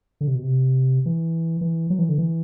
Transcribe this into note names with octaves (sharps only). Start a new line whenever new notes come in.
D3
C3
B2
C3
E3
E3
F#3
E3
D3
E3